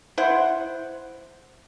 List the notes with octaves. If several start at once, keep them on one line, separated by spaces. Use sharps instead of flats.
E4 C5 F#5